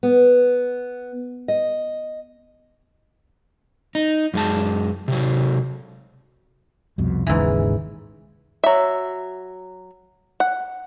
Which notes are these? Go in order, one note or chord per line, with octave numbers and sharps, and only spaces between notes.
B3
D#5
D#4
F#2 G#3 A5
C3 F#3
C2 F2 B2
G#1 D#2 G#2 C#3 E3
F#3 E5
F#5